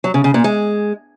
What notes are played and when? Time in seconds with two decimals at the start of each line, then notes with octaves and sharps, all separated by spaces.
0.04 F#3
0.14 C#3
0.24 C#3
0.34 A#2
0.44 G#3